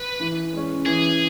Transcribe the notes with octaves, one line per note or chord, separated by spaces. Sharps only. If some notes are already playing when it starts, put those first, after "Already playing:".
Already playing: B4
E3
G#3 C#4
E3 G#4